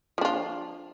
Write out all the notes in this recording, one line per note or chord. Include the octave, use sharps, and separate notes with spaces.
F3 D4 F4